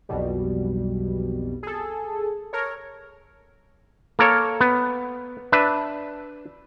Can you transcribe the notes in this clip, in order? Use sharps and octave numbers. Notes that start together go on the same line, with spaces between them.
B1 F2 B2 G3
G#4 A4
A4 A#4 C#5
A#3 A4 A#4 C#5
B3
D4 B4 E5